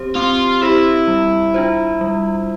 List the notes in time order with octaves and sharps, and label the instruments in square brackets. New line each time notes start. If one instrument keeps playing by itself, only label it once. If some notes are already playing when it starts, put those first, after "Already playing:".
Already playing: [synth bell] C4 G4 C5
[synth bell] C4 [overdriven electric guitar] F4
[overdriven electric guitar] E4 [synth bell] G4 C5
[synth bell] G3
D4 F4 C5
G3